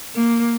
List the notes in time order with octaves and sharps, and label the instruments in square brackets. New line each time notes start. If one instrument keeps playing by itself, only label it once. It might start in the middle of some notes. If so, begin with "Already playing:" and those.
[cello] A#3